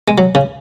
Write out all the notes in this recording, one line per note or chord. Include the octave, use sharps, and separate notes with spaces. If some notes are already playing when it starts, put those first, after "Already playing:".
G#3
F#3
C#3